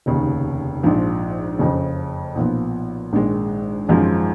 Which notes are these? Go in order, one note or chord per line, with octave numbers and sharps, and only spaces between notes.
F1 D#2 C#3
A#1 G#2 F3
F#1 F2 C#3
B1 A#2 F3 B3
A#1 G#2 D#3 G#3
G#1 F#2 F3 G#3